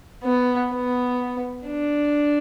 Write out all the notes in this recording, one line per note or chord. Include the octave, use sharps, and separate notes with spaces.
B3
B3
D4